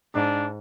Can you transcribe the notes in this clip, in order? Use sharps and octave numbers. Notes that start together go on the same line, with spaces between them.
G#2 D4